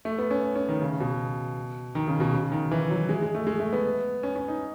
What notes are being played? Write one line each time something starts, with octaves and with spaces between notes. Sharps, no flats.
A3
B3
C#4
C#4
D#3
C#3
B2
D#3
C#3
B2
C#3
D#3
E3
F#3
G#3
G#3
A3
G#3
A3
B3
C#4
C#4
D#4